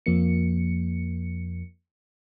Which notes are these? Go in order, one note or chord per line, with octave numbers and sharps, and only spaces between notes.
F2 F3 A#3 C#7